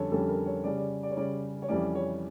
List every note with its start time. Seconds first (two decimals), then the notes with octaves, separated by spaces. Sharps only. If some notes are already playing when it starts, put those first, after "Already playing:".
Already playing: F2 D3 G3 C#4 A4 C#5
0.11 F2 D3 G3 C#4 A4
0.29 A#4
0.46 C#5
0.64 C#3 G3 C#4 D5
0.77 D5
1.03 D5
1.10 C#5
1.16 C#3 G3 C#4 D5
1.62 C#5
1.68 F2 E3 G3 C#4 D5
1.95 C#5